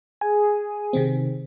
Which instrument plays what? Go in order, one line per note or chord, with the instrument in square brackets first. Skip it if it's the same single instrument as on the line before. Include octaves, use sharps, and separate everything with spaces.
[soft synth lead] G#4 [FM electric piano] G#5
[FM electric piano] C3 D#3 C4